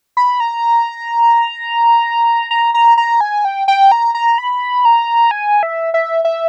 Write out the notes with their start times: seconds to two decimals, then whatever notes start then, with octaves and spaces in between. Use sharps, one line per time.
0.17 B5
0.40 A#5
2.51 A#5
2.74 A#5
2.98 A#5
3.21 G#5
3.45 G5
3.68 G5
3.92 A#5
4.15 A#5
4.38 B5
4.85 A#5
5.31 G#5
5.63 E5
5.94 E5
6.25 E5